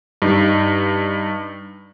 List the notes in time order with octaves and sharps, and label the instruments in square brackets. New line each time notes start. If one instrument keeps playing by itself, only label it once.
[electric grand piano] G2 D#4